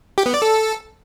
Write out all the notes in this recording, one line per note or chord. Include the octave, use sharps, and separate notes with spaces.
G4
B3
D5
A4